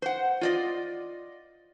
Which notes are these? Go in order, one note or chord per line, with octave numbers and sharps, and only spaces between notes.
C5 F#5
F4 D5 D#5